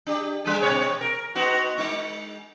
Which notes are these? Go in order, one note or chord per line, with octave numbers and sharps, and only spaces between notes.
D4 G4
G3 D4 G#4
B2 C4 C#5
A#4
B3 D#4 F#4
G#3 D#4